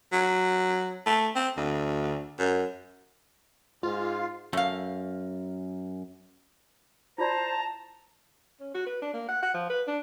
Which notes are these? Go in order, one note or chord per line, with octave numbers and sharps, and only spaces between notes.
F#3
A3
C4
D2
F#2
G#2 F4
F#2 A3 F5
E4 F4 C5 D5 A5 A#5
C#4
F#4
B4
D4
A#3
F#5
F#5
F3
B4
D4